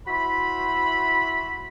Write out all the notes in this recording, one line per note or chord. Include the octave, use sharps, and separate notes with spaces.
E4 F#4 C5 E5 B5